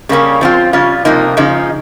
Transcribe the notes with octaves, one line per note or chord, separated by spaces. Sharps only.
C#3 G3 A#3 C#4
F3 C4 F4
C#3 G3 C#4 F4
C3 F3 A#3 D#4
C#3 F3 G#3 D#4